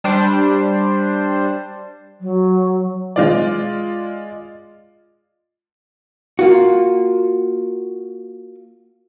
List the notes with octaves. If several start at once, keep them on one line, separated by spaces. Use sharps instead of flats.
G3 D4 C5
F#3
G#3 F4 D5
A#3 F4 F#4